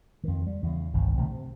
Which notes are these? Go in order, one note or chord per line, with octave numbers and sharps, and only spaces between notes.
F2 D#3
G3
E2 C#3
G1 C2 G2 D#3
A#1 C3 D#3 A3
C3